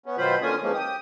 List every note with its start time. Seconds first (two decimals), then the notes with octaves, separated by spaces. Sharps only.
0.06 B3 C#4
0.18 B2 D#3 F#3 F4 C5 B5
0.42 D3 A#3 C#4 F4 G#5 D#6
0.62 E3 F3 G#3 A#3 C#4
0.74 G4 D#6